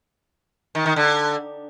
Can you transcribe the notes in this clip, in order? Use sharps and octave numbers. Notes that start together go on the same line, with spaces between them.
D#3
D#3
D3